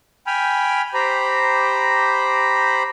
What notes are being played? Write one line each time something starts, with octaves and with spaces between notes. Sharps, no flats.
G5 G#5 B5 F6
G4 C5 A#5 B5